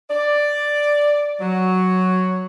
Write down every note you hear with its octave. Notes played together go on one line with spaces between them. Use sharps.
D5
F#3